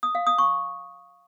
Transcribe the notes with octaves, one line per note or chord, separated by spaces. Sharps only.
D#6
F5
D#6
C#6